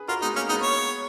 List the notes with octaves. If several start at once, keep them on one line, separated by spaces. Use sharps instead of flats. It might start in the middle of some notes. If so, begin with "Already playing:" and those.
Already playing: G#4 B4
F4 F#4 A#4
G#3 B3 D#4
A#3 C#4
G#3 B3 D#4
C#5